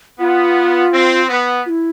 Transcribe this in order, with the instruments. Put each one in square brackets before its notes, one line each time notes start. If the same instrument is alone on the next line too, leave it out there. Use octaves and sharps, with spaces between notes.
[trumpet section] B3 [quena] F4
[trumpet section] C4
B3
[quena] F4
E4